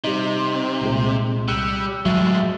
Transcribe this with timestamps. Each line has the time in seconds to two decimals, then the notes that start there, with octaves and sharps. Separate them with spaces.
0.04 C3 G3 D#4
0.82 C2 A#2 G#3
1.48 G3 E6 F#6 C#7
2.06 A2 F#3 G#3 E5 A6